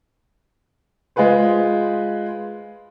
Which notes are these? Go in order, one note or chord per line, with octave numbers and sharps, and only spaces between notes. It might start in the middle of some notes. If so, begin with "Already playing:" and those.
G#3 F4 G#4 B4 C5